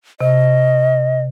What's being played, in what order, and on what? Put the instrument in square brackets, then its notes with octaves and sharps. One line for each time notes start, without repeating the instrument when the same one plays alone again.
[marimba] C3 [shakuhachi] D#5